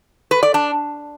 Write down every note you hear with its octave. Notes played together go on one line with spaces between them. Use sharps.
B4
D5
D4